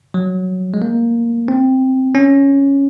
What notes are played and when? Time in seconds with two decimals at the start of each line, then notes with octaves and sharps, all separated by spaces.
0.14 F#3
0.74 G#3
0.82 A#3
1.48 C4
2.15 C#4